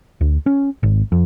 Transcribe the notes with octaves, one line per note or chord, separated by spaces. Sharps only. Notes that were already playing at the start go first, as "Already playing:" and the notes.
D2
C#4
G#1
F2